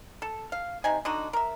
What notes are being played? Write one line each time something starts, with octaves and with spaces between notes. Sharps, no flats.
A4
F5
C3 D#4 G#5
D3 D#4 F#4
A#4 E5